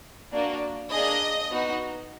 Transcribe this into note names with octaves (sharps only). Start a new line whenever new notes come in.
A#3 D4 F#4
A#3 D4 G#4 D#5
B3 D#4 F#4